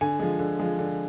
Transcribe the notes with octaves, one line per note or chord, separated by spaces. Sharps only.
D3 G#5
F3 G#3
D3
F3 G#3
D3